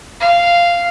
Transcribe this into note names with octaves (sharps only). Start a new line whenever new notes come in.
F5